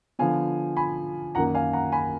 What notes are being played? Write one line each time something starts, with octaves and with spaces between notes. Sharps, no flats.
D3 F3 B3 F5 G#5
G#5 B5
F#2 D#3 A#3 F#5 A#5
F5 G#5
F#5 A#5
G#5 B5